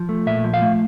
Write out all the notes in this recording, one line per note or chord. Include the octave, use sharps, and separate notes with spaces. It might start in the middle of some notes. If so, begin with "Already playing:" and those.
Already playing: F3
A3
A#2 E5
F3
F5
A3